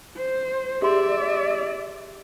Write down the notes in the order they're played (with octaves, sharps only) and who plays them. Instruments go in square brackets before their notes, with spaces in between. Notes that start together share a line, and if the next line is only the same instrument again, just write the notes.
[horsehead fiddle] C5
[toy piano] G4 G#4 C6 [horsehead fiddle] D5 E5